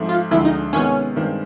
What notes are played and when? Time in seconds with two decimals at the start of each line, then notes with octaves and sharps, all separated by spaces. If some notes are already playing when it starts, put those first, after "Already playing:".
Already playing: G#2 F3 A3 C4
0.09 F4
0.31 D2 D3 F3 G#3 E4
0.45 D#4
0.73 C3 D#3 G#3 B3 C#4
1.16 G2 D#3 G#3 C4